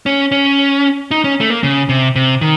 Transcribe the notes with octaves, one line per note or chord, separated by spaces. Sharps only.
C#4
C#4
D#4
C#4
A3
A#3
C#3
C3
C3
D#3